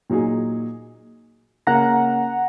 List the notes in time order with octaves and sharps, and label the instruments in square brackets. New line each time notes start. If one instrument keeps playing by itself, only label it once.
[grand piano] A#2 F#3 D#4 G#4
[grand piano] C#3 A#3 C#4 [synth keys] F#5 A#5